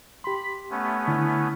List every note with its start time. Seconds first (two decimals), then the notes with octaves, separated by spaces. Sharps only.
0.24 G4 B5 C6
0.70 A3 B3 C#4
1.08 D3 E4